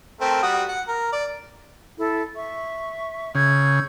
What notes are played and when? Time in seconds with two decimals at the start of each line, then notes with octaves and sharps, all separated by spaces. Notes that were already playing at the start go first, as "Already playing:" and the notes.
0.21 A3 C4 A#4
0.43 G3 F#4 D#6
0.69 F#5
0.88 A#4
1.12 D5
1.98 E4 A4
2.35 E5 C#6
3.35 C#3 E6 G6 G#6